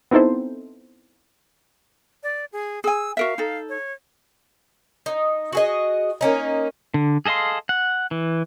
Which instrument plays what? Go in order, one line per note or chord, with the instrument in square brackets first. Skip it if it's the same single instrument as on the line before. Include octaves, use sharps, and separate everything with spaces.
[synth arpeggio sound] B3 C4 D#4 E4 A4 C5
[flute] D5
G#4
[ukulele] G#4 G#5 [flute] E6
[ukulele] F#4 A#4 E5 [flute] F5
[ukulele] D#4 A4
[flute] C#5
[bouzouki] D#4
F#4 G#4 D#5
A#3 C#4 D#4
[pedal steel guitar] D3
G#4 A4 D#5 F5 C6
F#5
E3